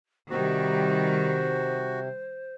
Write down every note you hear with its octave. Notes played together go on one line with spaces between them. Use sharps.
C3 D#3 G3 F#4 C5